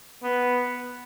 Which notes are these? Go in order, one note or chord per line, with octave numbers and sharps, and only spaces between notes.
B3